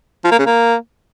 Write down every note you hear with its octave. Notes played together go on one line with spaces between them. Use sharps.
F3
A#3
C#3
A#3